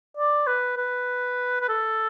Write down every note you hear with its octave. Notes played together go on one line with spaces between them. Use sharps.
D5
B4
B4
B4
A4